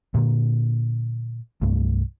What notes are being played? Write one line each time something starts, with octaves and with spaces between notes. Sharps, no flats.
A#2 D3 A#3
C2 G2 A3